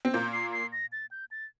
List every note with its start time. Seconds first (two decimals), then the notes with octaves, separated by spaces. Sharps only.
0.05 C4
0.13 A#2 A#3 G6
0.33 C7
0.53 C7
0.72 A#6
0.92 A6
1.11 G6
1.31 A6